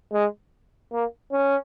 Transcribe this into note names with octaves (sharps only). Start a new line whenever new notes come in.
G#3
A#3
C#4